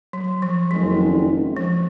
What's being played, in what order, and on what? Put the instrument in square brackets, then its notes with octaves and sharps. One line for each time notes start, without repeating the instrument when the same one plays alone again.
[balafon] F#3
F3
[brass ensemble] F#1 F2 D#3 G#3 [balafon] F#3
[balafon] F3